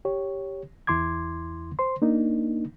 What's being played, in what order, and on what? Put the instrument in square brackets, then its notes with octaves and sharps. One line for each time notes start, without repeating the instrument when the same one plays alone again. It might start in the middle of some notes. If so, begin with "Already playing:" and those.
[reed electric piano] G4 C#5
E2 E4 C6 D6 G#6
C5 C6
A#3 D4 D#4